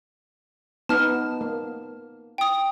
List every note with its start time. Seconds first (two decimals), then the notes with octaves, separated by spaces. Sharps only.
0.89 B3 D#4 A5 F6
1.41 A#3
2.38 G5 D#6